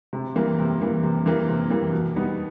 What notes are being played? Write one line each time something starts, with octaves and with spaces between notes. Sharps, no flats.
C3
E3 G3 A#3
C3
E3 G3 A#3
C3
E3 G3 A#3
C3
E3 G3 A#3
B2
G3 B3 D#4